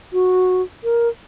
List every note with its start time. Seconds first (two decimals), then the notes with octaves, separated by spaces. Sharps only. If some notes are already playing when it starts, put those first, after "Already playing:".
0.13 F#4
0.84 A#4